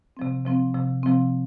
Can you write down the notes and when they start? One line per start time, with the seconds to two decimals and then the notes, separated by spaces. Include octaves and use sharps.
0.17 C3 F3 C4
0.45 C3 F3 C4
0.75 C3 F3 C4
1.03 C3 F3 C4